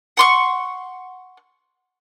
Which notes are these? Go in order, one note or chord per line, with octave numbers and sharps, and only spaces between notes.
F#5 C6 C#6